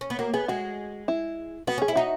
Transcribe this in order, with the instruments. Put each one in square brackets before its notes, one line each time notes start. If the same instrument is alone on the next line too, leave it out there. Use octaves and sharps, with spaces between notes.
[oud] C#4
B3
[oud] A#3 [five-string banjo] F#4
[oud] B3 [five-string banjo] G#4
[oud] G#3 [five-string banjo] F#4
[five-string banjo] E4
[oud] B3 [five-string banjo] F#4
[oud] C#4 [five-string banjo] G#4
[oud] E4
[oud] D#4 [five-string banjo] F#4